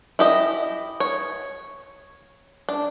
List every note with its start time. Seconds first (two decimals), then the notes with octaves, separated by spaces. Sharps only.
0.19 E4 G4 D#5
1.00 C#5
2.69 D4